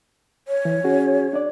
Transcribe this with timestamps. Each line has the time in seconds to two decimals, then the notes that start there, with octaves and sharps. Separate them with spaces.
0.48 C#5
0.65 E3
0.84 C#4 F#4 G#4
1.33 D4 D5